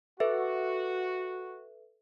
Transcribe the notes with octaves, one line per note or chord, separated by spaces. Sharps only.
F#4 A4 B4 E5